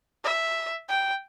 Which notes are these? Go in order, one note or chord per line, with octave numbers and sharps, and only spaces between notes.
E5
G5